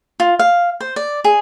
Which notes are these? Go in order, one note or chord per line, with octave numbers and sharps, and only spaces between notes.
F4
F5
C5
D5
G#4